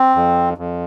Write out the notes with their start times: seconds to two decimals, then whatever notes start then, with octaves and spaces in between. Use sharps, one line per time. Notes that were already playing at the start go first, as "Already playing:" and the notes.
Already playing: C4
0.15 F2
0.58 F2